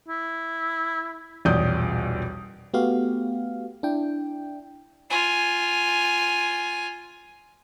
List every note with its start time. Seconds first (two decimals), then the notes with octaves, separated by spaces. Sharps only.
0.08 E4
1.45 D#1 B1 E2 D5 D#6 G6
2.74 A3 B3 F#4 G4 F5
3.83 D4 E4 G5
5.10 F4 G#5